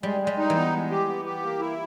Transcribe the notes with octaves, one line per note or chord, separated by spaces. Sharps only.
G3 G#3
G#3
G3
D#4
E3
B3
G#3
G4
B3
G4
A#3
E4